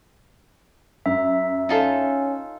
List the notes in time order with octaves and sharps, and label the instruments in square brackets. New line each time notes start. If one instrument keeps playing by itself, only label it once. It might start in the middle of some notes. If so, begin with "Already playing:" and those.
[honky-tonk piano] F#2 [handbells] E5
[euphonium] C#4 [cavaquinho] D#4 F4 A4